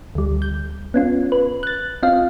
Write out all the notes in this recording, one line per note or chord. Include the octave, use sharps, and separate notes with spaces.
D2 G3
G6
B3 C#4 F4
B4
F#6 A6
C4 F4 D#5 F5